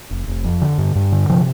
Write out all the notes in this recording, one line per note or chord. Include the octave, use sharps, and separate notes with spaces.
F1
F1
F2
D3
G2
G2
D3
C3 F3